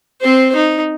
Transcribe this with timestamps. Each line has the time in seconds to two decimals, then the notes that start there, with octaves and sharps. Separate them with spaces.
0.21 C4 C5
0.56 D#4